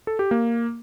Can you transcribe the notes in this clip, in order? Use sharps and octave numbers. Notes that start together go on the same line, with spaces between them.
A4
G4
A#3